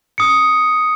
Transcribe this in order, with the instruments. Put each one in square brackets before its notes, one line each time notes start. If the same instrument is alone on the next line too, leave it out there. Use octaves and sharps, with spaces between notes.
[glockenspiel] D#6 C#7